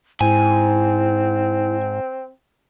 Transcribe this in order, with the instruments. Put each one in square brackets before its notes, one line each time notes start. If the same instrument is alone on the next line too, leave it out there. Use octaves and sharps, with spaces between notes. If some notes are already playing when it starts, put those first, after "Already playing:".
[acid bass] G#2 [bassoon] C4 [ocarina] E4 [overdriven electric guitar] G#5